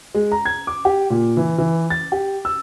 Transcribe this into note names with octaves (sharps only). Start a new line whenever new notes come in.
G#3
A#5
G#6
D6
G4
A#2
E3
E3
A6
G4
E6